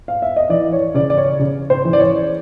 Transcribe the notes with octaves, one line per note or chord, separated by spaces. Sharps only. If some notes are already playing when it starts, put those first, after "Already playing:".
F5
E5
D#5
E3 D5
C#5
C#3 D5
D5
C#5
C#3
C5
E3
D5
C#5